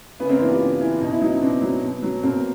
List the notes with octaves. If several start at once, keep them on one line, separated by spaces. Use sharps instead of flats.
C#3 B3 C#4
A#3 C4
E3 C4 D4
F4 G4
C#3
E3
B2 D#4
E4
F#3 C#4 D#4
B2 C4 D4
F#3
B2
F#3
B2 A#3 C4